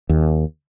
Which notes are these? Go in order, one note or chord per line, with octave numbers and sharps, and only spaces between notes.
D#2